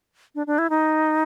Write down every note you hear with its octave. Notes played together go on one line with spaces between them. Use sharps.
D4
D4
E4
D#4